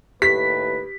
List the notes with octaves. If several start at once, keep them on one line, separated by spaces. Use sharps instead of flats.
D#2 A2 G4 B4 B6